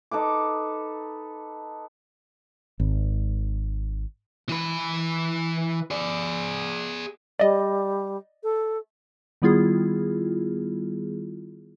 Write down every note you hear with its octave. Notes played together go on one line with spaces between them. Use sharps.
D#4 A4 B4 D6
G#1
E3 B4
G#4 D5
G3 D5 D#5
A4
D#3 G3 B3 E4 F4 G#4